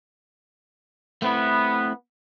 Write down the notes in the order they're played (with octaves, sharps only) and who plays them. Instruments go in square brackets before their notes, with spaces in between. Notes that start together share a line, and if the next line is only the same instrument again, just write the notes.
[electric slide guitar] A3 C4 E4 [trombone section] B3